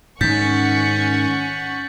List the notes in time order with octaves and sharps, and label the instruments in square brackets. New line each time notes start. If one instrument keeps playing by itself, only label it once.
[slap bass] G#2 D#3 [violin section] C#4 F#5 C#6 [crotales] G6 A6 B6